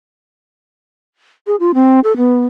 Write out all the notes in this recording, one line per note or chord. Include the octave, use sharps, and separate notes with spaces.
G#4
F4
C4
A4
B3